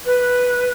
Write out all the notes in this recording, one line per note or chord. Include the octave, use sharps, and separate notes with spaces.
B4